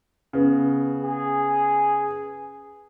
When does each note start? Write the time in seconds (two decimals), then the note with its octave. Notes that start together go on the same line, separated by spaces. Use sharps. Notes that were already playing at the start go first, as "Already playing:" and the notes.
0.33 C#3 B3
1.03 G#4